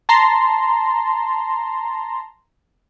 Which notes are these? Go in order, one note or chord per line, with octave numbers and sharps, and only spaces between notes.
A5 A#5 C6